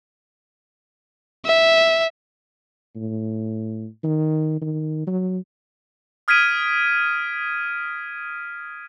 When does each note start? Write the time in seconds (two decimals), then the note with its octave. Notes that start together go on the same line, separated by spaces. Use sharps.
1.46 E5
2.96 A2
4.04 D#3
4.62 D#3
5.07 F#3
6.28 D#6 F6 G#6 B6 D7 D#7